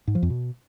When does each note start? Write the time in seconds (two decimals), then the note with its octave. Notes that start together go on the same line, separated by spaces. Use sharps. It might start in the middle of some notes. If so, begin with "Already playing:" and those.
0.07 G#2
0.15 F3
0.23 F2
0.30 B2